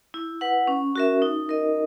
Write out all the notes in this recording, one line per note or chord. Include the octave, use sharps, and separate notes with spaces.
E4
B4 F#5
C#4
F#4 A#4 E5
D#4
A#4 D#5